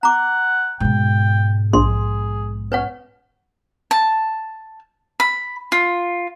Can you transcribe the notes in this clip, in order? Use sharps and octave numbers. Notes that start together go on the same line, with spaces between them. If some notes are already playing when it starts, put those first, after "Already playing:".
F#5 A#5 D6
G#2 B2 G5
A#1 G#4 C6
C#4 B4 C#5 F#5
A5
B5
F4